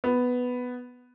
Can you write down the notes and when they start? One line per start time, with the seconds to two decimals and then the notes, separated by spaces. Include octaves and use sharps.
0.04 B3